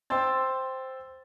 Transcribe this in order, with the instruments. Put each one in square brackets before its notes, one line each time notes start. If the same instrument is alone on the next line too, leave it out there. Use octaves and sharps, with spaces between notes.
[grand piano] C5 G5 C6 E6 A6